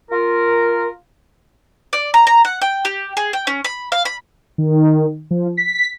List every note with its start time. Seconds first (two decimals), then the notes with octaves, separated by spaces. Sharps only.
0.09 F4 A#4
1.93 D5
2.14 A#5
2.27 A#5
2.45 F#5
2.62 G5
2.85 G4
3.17 G#4
3.33 G5
3.47 C#4
3.64 B5
3.92 F5
4.05 B5
4.58 D#3
5.31 F3
5.57 B6